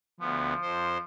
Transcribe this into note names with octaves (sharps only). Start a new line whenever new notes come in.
D2 F3 B3
F2 C5